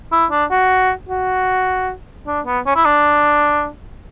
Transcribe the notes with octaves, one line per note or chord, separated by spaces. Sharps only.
E4
D4
F#4
F#4
D4
B3
C#4
E4
D4